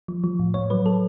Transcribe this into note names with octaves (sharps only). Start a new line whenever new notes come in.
F3
F3
A2
A2 C#5
F#3 B4
F#3 A4